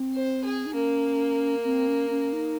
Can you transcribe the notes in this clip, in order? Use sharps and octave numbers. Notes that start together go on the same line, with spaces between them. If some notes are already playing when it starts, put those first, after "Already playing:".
Already playing: C4
C5
G#4
D#4
A#3 C#4
C4
C#4
C#4
D#4